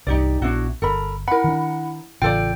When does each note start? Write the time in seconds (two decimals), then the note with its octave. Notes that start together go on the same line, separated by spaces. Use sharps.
0.07 C2 G2 D#4 G4 D5
0.42 A#1 B3 D4 E4 F#4
0.82 G1 A4 A#4 B5
1.28 E4 A#4 F#5 B5
1.44 D#3 D4
2.22 A1 C#3 F4 A4 D5 G5